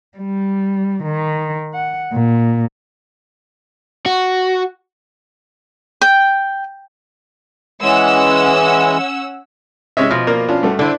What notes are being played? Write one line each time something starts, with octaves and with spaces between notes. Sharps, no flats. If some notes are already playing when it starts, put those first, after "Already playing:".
G3
D#3
F#5
A#2
F#4
G5
E3 G#3 C#4 F#5 E6
C3 G#3 C#4 C#5 D#5 E5
B2 F3 D#5 F6
A#3 A#4 D5
C#4 D4 F4
G2 A3 F#4
D3 D4 E4 A4 C5